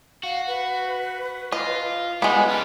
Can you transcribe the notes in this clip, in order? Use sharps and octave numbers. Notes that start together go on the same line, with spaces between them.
F#4 F5
B4
F4 D#5
G3 G#3 B3 G#5
C#4 G4 A5